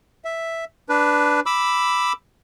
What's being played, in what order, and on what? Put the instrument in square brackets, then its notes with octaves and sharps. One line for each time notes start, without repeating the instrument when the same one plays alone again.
[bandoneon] E5
D4 B4
B5 D6 E6